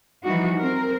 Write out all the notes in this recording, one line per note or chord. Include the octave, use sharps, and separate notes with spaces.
E3 F3 G3 D#4 F#4
C4 A#4